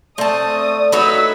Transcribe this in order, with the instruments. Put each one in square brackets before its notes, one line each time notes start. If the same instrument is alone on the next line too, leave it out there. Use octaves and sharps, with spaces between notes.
[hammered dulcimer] A3 [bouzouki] C4 A5 [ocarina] D5 [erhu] D#6
[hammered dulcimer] D#4 [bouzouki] F#4 B4 C#5 [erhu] E6